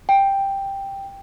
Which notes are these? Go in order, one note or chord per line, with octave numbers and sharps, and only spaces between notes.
G5